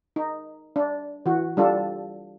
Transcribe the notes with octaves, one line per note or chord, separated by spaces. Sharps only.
D#4
D4
E3 F#4
G3 D4 F4 A4